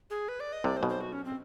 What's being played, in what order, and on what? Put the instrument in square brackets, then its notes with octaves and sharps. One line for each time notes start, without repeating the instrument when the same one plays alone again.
[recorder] G#4
B4
D5
D#5
[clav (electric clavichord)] C2 C3 [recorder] D5
[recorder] C5
[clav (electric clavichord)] B1 B2
[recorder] C5
F#4
C#4
C4